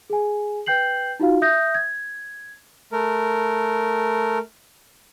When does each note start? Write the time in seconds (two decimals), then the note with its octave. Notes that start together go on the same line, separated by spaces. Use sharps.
0.10 G#4 G#5
0.66 B4 G5 G6 C7 F#7
1.19 D#4 F4 F#4 F5
1.41 E5 D#6 G6 A#6
1.74 G#6
2.92 A3 A#4